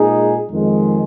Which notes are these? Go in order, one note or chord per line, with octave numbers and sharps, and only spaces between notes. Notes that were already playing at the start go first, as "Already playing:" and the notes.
Already playing: A#2 G#3 D#4 G#4
F2 D#3 G#3